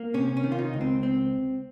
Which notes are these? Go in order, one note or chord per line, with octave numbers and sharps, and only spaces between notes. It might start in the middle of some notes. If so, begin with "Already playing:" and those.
Already playing: A#3
C3 C#4
C#4
D#3
F4
D#4
C#2
C4
C4